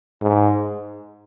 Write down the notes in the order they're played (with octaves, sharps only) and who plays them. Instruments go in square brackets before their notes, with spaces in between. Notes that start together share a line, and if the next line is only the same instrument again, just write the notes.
[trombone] G#2